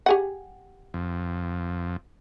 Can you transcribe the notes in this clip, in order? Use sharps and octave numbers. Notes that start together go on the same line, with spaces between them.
G4 G#4 F#5
F2